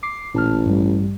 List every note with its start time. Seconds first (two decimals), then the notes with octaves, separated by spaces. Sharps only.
0.03 D6 C7
0.34 A1 A#2 A5 F6
0.66 G2 G3